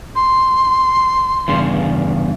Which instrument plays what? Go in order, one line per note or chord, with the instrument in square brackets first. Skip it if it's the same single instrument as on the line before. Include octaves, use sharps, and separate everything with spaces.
[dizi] C6
[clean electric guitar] E2 G2 C#3